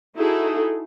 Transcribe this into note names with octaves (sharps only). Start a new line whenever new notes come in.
D#4 E4 F#4 G#4 A4